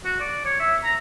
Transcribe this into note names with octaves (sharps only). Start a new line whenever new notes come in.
F#4
D5
C#5
E5
A#5